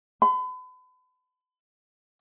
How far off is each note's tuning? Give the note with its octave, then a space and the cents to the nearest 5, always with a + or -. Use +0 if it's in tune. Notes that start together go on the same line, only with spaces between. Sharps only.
B5 +40